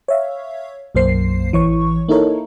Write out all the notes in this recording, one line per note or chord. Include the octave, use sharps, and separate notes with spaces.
C#5 E5 F5
B1 F#2 A#3 C5 C7
A1 E3 C#5 C#6
A#3 D#4 E4 A4 A#4 C#5